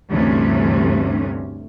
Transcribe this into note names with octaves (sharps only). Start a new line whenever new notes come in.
D2 G2 C3 E3 A3 C#4